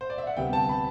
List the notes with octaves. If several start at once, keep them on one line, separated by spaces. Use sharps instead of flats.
C5
D5
E5
F#5
D2 C3 G3 B3 G5
A5
B5